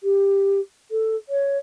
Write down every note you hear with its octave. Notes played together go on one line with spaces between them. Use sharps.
G4
A4
C#5